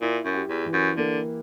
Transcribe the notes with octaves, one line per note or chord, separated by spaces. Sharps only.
A#2 E4
F#2
G4
E2
E3
F#2
D3 A#3